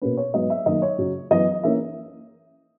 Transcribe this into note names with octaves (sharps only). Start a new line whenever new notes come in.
B2 A#3 C#4 B4
C#5
G#2 F#3 B3 D#5
E5
F#2 D#3 A#3 D#5
C#5
F#2 C#3 F#3
F#2 E3 B3 D#5
E3 A#3 C#4 E5